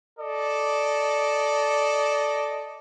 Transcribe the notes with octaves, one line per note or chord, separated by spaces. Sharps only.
A4 D5 D#5